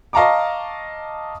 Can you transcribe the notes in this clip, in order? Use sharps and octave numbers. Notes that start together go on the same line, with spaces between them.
D#5 F5 A5 A#5 C#6 D6